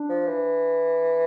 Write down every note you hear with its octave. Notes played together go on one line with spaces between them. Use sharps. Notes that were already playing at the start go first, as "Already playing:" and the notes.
Already playing: D4
F3
E3